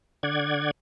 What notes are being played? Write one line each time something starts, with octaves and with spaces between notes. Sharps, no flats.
D3 D5 F#5 G#6